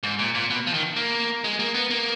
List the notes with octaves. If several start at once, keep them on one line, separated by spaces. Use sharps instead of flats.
G#2
A#2
A#2
B2
F3
D#3
A#3
G#3
A#3
B3
A#3